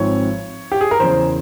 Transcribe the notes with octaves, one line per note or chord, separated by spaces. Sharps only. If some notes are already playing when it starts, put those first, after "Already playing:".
Already playing: G#1 G#2 F3 C4 C#5
G4
G#4
A#4
E2 C#3 E3 C5